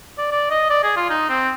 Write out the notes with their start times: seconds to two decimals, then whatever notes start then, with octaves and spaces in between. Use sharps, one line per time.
0.18 D5
0.31 D5
0.50 D#5
0.70 D5
0.83 G#4
0.96 F4
1.10 D#4
1.29 C4